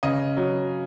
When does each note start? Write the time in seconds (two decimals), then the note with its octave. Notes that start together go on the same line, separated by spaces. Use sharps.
0.03 C#3 D#5
0.37 F#3